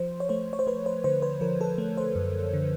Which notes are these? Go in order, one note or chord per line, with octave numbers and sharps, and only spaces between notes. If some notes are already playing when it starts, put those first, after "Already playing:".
Already playing: F3 C5
C#5
A3 C5
C#5
C5
A3 B4
C5
D3 C5
B4
F3 A#4
A4
A3
C5
F#2
D3